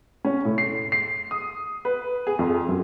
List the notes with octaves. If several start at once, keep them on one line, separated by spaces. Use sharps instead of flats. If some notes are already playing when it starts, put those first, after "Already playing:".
C#4
A2
C7
C7
D#6
B4
G#4
F2
F#2